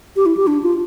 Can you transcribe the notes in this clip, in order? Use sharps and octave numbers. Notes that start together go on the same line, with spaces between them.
G4
E4
G4
D4
F4